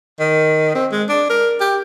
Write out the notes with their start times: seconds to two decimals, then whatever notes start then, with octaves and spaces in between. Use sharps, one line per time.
0.20 D#3
0.75 C4
0.92 G#3
1.09 D4
1.30 A#4
1.61 G4